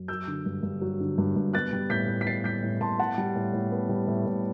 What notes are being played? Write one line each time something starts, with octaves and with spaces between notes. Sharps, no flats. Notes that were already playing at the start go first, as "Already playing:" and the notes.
Already playing: F#2
F#3 E6 G6
D3
G2
G2
F#3
D3
G2
G2
B3 F#6 A6
G3
A2 G6 B6
A2
B6
B3 A6 C7
G3 G6 B6
A2
A2 A5 C6
B3 F#5 A5
G3
A2
A2
B3
G3
A2
A2